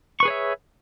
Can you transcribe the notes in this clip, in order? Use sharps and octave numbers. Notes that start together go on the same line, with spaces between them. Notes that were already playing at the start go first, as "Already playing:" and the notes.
G#4 B4 C#5 E5 C#6